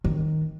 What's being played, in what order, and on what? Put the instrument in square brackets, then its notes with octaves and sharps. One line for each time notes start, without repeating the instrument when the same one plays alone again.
[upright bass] D#3